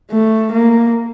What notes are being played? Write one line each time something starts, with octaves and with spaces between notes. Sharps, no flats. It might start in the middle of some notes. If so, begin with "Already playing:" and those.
A3
A#3